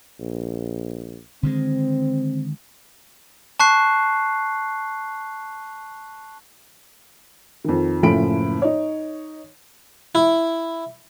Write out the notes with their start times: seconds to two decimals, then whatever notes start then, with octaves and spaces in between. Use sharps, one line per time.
0.20 A#1
1.43 D3 D#3 G#3 C4
3.60 A5 C#6 F#6 C7
7.64 F2 D#3
8.03 F#1 A2 F3 C#4 B5 D7
8.62 D#4 C#5
10.15 E4